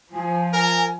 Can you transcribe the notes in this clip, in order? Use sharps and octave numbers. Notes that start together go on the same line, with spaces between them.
F3 G#5
A#4